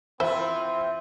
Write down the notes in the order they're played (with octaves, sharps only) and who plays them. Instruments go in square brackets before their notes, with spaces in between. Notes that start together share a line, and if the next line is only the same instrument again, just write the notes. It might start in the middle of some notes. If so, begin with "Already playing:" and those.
[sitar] E3 F4 [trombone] C4 [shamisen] C5 [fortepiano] E5 B5 E6